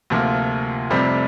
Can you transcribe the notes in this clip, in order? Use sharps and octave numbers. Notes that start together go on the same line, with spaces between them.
D2 C3 F3 A#3 F4
F1 F2 C3 G3 C4